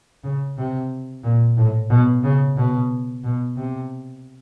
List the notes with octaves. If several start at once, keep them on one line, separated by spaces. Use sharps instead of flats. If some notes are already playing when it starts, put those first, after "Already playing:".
C#3
C3
A#2
A2
B2
C#3
B2
B2
C3